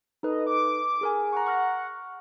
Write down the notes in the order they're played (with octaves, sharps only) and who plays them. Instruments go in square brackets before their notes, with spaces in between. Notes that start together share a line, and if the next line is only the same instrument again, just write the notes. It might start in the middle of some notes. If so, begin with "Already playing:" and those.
[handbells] D#4 A4 B4 [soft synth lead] D#5
[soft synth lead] D6
[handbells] G#4 A#4 G#5
[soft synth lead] F#5 [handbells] A#5 C#6
[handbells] C#6 F6 A#6